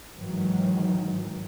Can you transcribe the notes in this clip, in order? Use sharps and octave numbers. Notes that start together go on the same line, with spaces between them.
G#2 D#3 E3 F#3